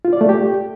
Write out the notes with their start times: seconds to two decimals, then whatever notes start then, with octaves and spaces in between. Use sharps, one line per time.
0.05 F4
0.13 D5
0.21 A3
0.29 G4